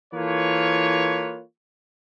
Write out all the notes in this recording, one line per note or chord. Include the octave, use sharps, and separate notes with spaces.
E3 A#3 F4 A4 B4 C#5